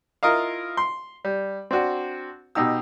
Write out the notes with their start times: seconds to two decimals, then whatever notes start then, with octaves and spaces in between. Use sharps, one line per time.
0.23 E4 F4 A#4 D#5 F5
0.77 C6
1.25 G3
1.71 C4 D4 F#4
2.55 B2 D#4 G4 E6